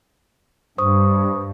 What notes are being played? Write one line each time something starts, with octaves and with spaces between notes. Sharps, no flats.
G2 C5 C#6 D#6